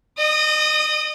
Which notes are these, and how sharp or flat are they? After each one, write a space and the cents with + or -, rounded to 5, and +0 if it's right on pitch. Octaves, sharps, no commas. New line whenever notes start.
D#5 -30 D#6 +0